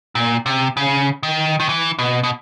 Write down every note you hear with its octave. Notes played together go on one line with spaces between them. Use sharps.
A#2
C3
C#3
D#3
D#3
E3
B2
B2